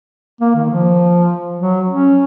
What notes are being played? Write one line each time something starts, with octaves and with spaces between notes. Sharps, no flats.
A#3
D#3
F3
F#3
C#4